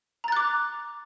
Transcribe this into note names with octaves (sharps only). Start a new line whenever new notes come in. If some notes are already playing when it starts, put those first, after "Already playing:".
A#5 D6 F#6 A6